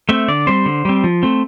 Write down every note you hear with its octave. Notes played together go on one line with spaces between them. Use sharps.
A3 C4 E5
D3 D5
G3 C4 C5
D3
G3 C4
F3
A3 C4